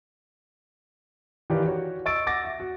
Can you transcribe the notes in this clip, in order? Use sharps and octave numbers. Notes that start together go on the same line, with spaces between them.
D#3 E3 G4 D5 F5
F#4 C#5
D#5 C#6 E6 A6 D7
F#5 D6 A6 A#6
E5
F#4